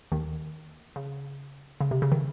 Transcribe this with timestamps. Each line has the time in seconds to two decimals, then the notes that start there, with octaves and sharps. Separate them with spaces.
0.12 D#2 D#3
0.96 C#3
1.81 C#3
1.91 C3
2.02 C#3
2.12 D#3